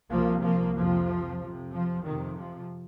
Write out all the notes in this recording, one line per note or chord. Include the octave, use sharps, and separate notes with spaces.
C2 C3 F3 A#3
F3 A#3
F2 C3 F3
F2 C3
F3
F2 C3 D#3
F3